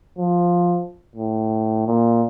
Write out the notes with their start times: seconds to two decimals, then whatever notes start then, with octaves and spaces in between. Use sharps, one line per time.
0.18 F3
1.16 A2
1.87 A#2